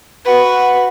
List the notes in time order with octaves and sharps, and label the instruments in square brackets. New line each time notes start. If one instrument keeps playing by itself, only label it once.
[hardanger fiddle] F#4 B4